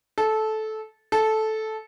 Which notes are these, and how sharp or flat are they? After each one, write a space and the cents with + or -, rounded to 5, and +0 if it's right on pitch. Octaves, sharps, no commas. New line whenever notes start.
A4 -15
A4 -10